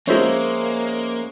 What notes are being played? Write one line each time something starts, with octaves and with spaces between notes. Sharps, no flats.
F3 G#3 A#3 C#4 C5 E5